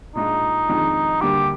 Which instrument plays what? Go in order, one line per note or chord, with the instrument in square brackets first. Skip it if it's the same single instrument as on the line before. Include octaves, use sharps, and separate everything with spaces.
[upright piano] A#2 G#3 D4 F4 [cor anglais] D#4
[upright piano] F2 D#3 G#3 D4
[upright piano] D2 D3 G3 A#3 [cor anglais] G4